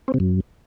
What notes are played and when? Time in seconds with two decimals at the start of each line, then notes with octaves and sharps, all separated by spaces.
0.08 C4
0.14 C3
0.20 F#2